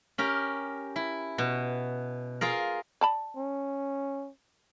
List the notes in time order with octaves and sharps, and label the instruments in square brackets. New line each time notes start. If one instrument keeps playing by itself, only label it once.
[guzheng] C#4 G4 A#4
E4
B2
F4 G#4 A#4
[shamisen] D5 A5 B5
[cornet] C#4